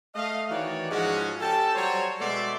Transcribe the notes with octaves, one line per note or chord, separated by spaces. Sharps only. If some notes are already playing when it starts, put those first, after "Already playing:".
A3 D#5 F5
D#3 E3 F#4 C#5 D5
G#2 F3 G#3 C#4 F#4
C#4 G4 A4 G5 A5
F#3 G3 C5 C#5
B2 G#3 A3 D5 E5 C6